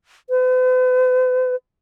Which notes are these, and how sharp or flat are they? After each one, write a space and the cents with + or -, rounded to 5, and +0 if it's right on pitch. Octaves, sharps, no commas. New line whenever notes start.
B4 +45